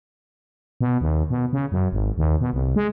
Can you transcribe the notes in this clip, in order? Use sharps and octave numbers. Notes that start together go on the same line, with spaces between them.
B2
D#2
B2
C#3
F#2
G#1
D#2
B2
C2
G#3